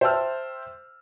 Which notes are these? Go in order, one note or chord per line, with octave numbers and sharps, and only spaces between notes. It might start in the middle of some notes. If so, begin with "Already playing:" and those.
C5 E5 G5 A5 E6 F6